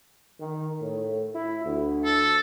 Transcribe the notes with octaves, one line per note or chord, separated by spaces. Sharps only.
D#3
A2
E4
D2
A4